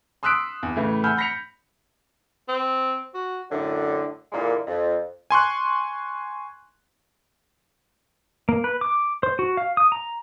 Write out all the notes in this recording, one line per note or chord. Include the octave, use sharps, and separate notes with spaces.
C6 D#6 E6 F#6 B6 D7
E2
A2 C#3 E3 A3
F#5 G#5 B5 E6 F6 G6
B5 A#6 B6 C#7 F7
C4
F#4
F#2 A2 D3
A#2 D3 E3 G#3 A#3
F2
G#5 C6 C#6 F#6
A#3
B4
D6
C5
F#4
F5
D#6
A#5